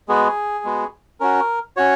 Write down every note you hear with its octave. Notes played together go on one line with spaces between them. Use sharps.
G#3 B3 F#4 G#4
G#3 B3 F#4
C#4 F#4 A#4
C#4 F#4 C#5